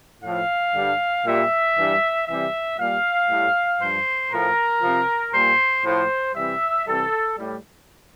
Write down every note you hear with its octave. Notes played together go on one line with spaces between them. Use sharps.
A2 F3 F5
G2 D3 G3
A#2 G3 E5
G2 E3 G3
C3 E3 G3 E5
A#2 G3 F5
A2 G3
G2 F3 C5
A2 F3 A#4
C3 F3
A#2 G3 C5
A2 F3 C5
C3 E3 G3 E5
C3 E3 G3 A4
A2 G3